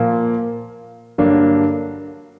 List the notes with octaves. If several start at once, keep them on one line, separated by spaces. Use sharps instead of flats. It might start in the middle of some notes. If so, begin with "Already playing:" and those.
Already playing: A#2 F3 A#3
G2 D3 F#3 A#3 D4